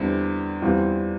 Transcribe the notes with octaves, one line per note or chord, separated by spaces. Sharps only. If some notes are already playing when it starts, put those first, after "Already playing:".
Already playing: E2 D3 G3 C4 E4
E2 E3 G3 C4 F4